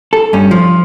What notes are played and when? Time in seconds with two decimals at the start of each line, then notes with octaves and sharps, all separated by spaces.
0.13 A4
0.33 G2 C#4
0.51 F3